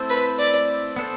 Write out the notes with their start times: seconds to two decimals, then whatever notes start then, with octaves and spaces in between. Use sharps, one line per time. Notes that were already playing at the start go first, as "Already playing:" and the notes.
Already playing: A3 C4 E4 A4 C5
0.10 B4
0.39 D5
0.96 B3 D4 A4 C5